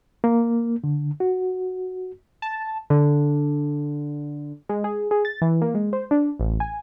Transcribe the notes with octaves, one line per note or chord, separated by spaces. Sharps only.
A#3
D3
F#4
A5
D3
G#3
G#4
G#4
A6
E3
A#3
G#3
C5
D4
A1
G#5